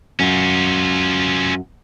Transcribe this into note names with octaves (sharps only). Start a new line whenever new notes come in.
F#2 C#4 F4